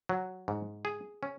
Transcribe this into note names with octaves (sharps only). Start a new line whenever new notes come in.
F#3
G#2
G#4
C#4